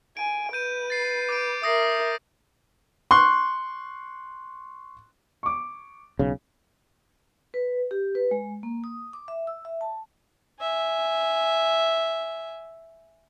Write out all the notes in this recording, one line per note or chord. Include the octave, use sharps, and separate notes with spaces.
G#5 D7
B4 G6 D#7
A6 C7
D6 G6 D7
A#4 E5 D#6 A#6 C7
C6 C#6 F#6
C#6 D6
B1 C#3
B4
G4
B4
G#3
A#3
D#6
D6
E5
E6
E5
A5
E5 G#5